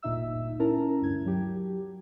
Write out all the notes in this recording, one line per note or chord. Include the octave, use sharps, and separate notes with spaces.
G1 D2 A#2 D#4 E5 E6
C#4 E4 A#4 A5 A#5
D2 G2 G#6
F#3 G4